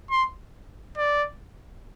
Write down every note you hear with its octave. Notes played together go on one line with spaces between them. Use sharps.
C6
D5